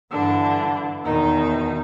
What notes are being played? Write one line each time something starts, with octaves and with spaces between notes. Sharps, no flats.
G2 D3 E3 D4
E2 B2 D#3 D#4